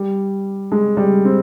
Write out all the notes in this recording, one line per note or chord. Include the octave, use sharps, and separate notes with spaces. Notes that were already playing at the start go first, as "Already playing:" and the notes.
Already playing: G3
G#3
G3
C4